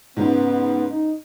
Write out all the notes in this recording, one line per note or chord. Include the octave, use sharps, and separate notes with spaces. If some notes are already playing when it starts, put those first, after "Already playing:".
G#2 C#3 B3
D#4